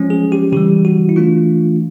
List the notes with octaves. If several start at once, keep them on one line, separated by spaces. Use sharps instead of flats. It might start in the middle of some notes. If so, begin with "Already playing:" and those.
Already playing: F3 G#3 C#4
G#4
G4
C#3 E3 G3 G4
F#4
E4
E3 A3 D4 F4